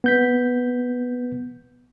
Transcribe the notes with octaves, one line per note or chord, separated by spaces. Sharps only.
B3 G6 B6